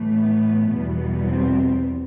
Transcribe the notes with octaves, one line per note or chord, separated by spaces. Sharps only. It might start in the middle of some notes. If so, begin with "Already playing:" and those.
Already playing: A2 E3 A3
B3
E2 B2 G3 B3
C4